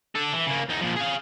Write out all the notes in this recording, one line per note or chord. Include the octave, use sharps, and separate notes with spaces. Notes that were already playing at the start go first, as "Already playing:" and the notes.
D4 A4
E3
C#3 A#3
E2 D#4
A#2 F3
G#4 F5